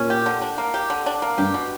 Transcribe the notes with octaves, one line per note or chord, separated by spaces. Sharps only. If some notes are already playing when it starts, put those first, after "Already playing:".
Already playing: A#2 C#4
G4
D3
D4
A#3
G4
D3
D4
A#3
G2 G4
B2